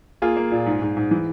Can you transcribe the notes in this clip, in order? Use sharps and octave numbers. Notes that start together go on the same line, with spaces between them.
A#3 F4 G#4
A#3
A#2
G#2
G#2
G#2
E3